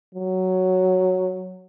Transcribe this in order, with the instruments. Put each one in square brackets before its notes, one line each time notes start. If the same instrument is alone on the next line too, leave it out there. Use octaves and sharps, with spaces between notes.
[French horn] F#3